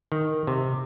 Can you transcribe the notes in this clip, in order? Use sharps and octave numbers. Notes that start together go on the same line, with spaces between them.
D#3
C3